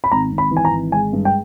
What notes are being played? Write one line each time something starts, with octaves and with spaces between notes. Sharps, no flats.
B5
G#1 A#5
G#1
B5
E3
G#5
A#5
G#1
G#3 G#5
G2
G5